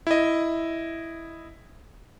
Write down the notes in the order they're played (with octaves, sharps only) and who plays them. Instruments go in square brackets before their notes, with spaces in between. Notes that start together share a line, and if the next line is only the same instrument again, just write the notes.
[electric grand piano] E4 D#5